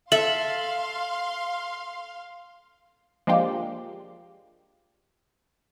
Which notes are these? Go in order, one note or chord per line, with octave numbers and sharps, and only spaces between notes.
A4 E5 F5 C6 F#7
F3 G#3 A#3 D4 F4 G4